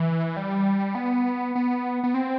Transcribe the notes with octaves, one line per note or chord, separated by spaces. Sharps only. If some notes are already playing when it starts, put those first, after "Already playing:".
Already playing: E3
G3
B3
B3
B3
C4